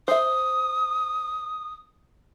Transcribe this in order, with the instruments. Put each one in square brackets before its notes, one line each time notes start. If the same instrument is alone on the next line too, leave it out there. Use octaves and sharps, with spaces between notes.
[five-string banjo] C5 E5 [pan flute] D#6